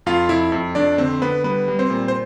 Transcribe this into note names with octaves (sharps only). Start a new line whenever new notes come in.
F2 F4 F5
F2 E4 E5
F2
F2 D4 D5
D3 C4 C5
D3 B3 B4
G3 B3 B4
G3
C4 C5
A#2
C5